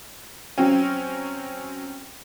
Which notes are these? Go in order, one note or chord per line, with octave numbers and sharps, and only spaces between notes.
F#3 C4 C#4